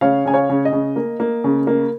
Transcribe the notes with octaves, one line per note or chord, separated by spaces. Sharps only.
C#3 C#5 F5
C#3 G#5
C#5 F5
C#3
D#5
C#3
A#3
A#3
C#3
A#3